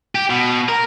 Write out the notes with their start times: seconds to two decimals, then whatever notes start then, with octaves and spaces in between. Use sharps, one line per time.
0.15 G4
0.30 B2
0.69 A#4